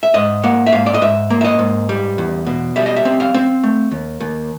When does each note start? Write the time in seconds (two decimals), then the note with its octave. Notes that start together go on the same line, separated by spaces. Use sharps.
0.03 E5
0.14 G#2 D#5
0.43 A#3 F#5
0.66 E5
0.72 G#2 F5
0.86 D5
0.94 D#5
1.01 G#2 E5
1.30 A#3
1.41 E5
1.44 D#5
1.59 G#2
1.89 G3
2.18 E2
2.47 B2
2.76 G3 E5
2.86 D#5
2.96 E5
3.05 C4
3.20 F5
3.34 C4
3.64 A3
3.91 D#2
4.20 D#2